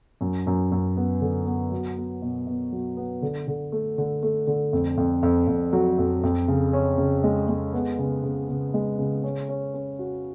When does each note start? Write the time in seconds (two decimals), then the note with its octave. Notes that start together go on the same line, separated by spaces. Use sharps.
0.21 F#2
0.47 F#2
0.72 F#2
0.97 B3
1.21 D3
1.46 B3
1.72 F#3
1.97 B3
2.22 B2
2.47 B2
2.73 F#3
2.97 B3
3.22 D3
3.47 D3
3.72 A3
3.98 D3
4.23 A3
4.47 D3
4.73 F2
4.98 F2
5.23 F2
5.48 F2
5.73 F#3
5.98 F2
6.23 F2
6.48 C#3
6.73 C#4
6.98 C#3
7.24 G#3
7.48 G#3
7.73 B3
7.99 C#3
8.24 C#3
8.49 C#3
8.74 G#3
8.99 C#3
9.24 C#4
9.49 C#4
9.74 C#4
9.99 F#4